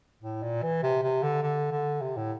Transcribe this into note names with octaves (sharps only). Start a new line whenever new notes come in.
A2
A#2
E3
C3
C3
D3
D3
D3
C3
A2